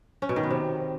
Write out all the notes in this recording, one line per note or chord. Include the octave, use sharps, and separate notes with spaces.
C#4
B2
D#3
B3
C3